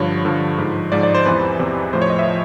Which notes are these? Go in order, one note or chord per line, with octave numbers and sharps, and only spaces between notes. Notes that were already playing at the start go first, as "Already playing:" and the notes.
Already playing: G2 D3 F3 C#5
G2 D3 F3
G#2 F3
G#2 F3 D5
D5
C5
E2 C3 E3 B4
E2 C3 E3
A2 F3 C5
C#5
D#5
E5
F3